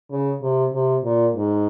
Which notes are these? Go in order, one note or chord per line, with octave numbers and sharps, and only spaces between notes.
C#3
C3
C3
A#2
G#2